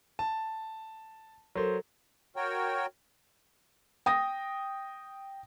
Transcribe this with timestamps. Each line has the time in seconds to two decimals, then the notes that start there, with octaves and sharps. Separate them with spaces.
0.19 A5
1.55 F#3 A4 A#4 C5
2.36 F#4 A#4 C#5 G5
4.06 G5 D#6 A#6